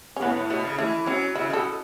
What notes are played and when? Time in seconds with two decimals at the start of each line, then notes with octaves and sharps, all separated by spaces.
0.17 C#4
0.21 A2 B3
0.36 A2
0.50 B2 A3
0.65 C#3
0.78 E3 A3
1.06 F#3 C#4
1.36 C#3 E4
1.50 B2 A4